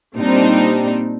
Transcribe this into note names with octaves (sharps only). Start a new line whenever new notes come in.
A#2 G3 C4 D4 D#4